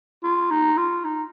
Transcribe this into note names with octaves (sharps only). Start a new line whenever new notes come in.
F4
D#4
F4
D#4